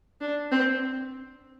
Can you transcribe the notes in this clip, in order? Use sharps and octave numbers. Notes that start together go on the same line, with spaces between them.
D4
C4